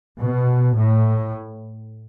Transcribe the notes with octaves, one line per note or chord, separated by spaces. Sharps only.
B2
A2